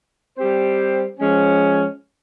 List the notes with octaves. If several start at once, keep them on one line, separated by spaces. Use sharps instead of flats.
G3 C4 G4 C5
F3 G#3 C#4